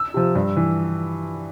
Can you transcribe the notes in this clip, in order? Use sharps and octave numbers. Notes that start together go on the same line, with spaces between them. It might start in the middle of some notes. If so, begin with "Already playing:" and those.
Already playing: E6
C3 F3
G2
E3